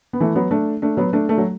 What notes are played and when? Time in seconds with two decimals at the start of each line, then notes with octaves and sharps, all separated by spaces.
0.13 B3
0.20 E3 A3
0.35 F#3 B3
0.51 A3 D4
0.82 A3 D4
0.97 F#3 B3
1.13 A3 D4
1.29 A3 D4
1.38 F#3